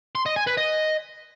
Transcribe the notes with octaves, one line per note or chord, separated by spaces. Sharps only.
C6
D#5
G#5
B4
D#5